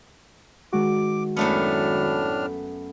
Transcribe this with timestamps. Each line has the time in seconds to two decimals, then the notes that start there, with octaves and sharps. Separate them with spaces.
0.73 D#3 G#3 F#4 D6
1.37 F#2 A2 A3 B3 D4 F6